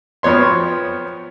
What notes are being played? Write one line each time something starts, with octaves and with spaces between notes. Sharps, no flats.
F2 F3 B3 C#5 C6